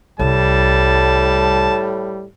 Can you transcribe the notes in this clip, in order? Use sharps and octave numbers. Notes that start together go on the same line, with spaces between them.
C2 A2 G3 A5